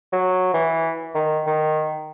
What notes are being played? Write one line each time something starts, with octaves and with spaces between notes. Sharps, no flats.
F#3
E3
D#3
D#3